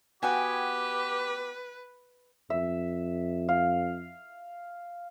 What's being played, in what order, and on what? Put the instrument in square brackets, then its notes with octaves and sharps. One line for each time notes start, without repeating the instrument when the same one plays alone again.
[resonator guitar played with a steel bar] B3 F#4 G5 [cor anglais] G4 [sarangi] B4 [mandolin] G#5
[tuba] F2 [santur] E5
[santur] F5